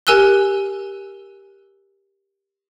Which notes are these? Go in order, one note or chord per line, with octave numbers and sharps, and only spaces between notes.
G4 A#4 G#5 E6 F#6 G7